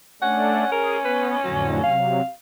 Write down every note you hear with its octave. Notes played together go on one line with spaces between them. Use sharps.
A3 C#4 D4 F#5
G#4 A#4
B3 B4
F2 A2 D3 F#3
C3 F#3 F5